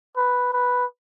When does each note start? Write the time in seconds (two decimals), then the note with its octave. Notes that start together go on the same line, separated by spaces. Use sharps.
0.16 B4
0.53 B4